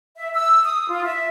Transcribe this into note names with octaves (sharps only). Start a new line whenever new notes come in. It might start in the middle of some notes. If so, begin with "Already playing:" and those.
E5
E6
D#6
F4
E5